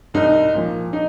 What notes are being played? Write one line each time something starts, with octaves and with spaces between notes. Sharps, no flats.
C2 D#4
A#2 F3
D#4